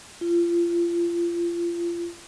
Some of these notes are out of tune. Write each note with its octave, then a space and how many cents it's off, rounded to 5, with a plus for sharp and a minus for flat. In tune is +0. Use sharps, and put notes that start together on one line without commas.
F4 -30